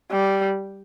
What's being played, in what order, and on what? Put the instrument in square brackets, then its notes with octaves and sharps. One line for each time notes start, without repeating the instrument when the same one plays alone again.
[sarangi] G3